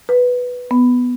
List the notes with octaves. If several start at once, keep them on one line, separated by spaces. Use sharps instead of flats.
B4
B3